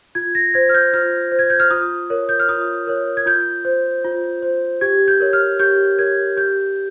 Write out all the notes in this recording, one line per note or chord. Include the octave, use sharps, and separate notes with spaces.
F4 G#6
A#6
C5 G#6
F6
G6
F4 F6
C5
G#6
G6
F6
F4 D#6
A#4 C#5
G6
F6
F4 D#6
A#4 C#5
G#6
F4 G6
C5
F4
C5
G4 G#6
G6
A#4 C#5
F6
G4 G6
A#4 C#5 G#6
G4 G6